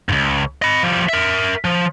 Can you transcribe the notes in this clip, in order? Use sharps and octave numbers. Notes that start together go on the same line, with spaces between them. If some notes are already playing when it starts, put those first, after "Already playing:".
C#2 G#2
D#5 B5
F3 G3
A#4 E5
F3